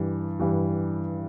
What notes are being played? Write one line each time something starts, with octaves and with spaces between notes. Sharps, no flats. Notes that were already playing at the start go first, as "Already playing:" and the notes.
Already playing: G2 E3
G2 E3